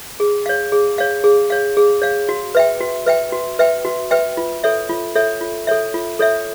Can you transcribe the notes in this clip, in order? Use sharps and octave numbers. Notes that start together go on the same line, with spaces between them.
G#4
C#5 F5
G#4
C#5 F5
G#4
C#5 F5
G#4
C#5 F5
F#4
B4 E5 G5
F#4
B4 E5 G5
F#4
B4 E5 G5
F#4
B4 E5 G5
F4
A4 C#5 E5
F4
A4 C#5 E5
F4
A4 C#5 E5
F4
A4 C#5 E5